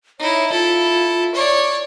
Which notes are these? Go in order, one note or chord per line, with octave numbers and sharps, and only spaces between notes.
D#4 E4 C#5
E4 F4 A4
C#5 D5